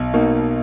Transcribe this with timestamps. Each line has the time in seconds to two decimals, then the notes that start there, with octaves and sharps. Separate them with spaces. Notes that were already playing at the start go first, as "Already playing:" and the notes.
Already playing: B1
0.13 B2 A#3 D#4